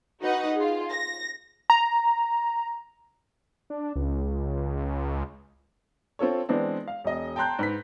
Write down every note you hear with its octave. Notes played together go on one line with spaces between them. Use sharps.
D#4 F#4 B4 D#5 F#5
F4 G#4
A#6
A#5
D4
C#2
C4 F4 A4 C#5
E3 G#3 B3 C4 D4
F5
E1 D#5
G5 A5 A#5 C6 F#6 G6
G#2 B4 B6